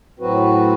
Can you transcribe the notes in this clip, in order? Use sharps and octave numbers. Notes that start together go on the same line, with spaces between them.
A2 F#3 C4 F#4 B4